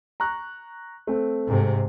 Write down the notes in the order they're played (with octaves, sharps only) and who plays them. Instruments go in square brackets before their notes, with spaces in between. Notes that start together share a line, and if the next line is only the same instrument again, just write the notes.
[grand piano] A#5 C#6 F#6
A3 C4
[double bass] G#2 C3